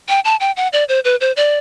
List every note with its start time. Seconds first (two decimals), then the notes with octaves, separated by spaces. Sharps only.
0.09 G5
0.25 A5
0.40 G5
0.57 F#5
0.73 D5
0.89 C5
1.05 B4
1.21 C5
1.37 D5